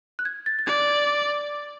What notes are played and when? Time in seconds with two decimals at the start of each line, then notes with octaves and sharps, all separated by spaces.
0.19 F#6
0.25 G#6
0.46 A6
0.59 A6
0.66 D5 G#6